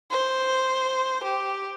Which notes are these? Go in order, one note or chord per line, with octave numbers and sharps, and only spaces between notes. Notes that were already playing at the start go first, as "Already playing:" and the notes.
C5
G4